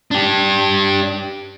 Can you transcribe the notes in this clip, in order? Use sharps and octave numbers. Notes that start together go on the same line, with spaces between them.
D4 G4